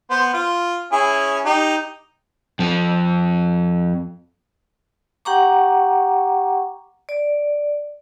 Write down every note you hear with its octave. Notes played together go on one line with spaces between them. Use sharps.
B3 C5
F4
C#4 E4 G#4
D#4 G4
F2 F3
G4 F#5 G5 A#5 C#6 D6
D5